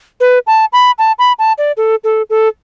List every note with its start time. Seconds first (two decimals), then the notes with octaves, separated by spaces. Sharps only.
0.20 B4
0.47 A5
0.73 B5
0.98 A5
1.19 B5
1.39 A5
1.58 D5
1.77 A4
2.04 A4
2.30 A4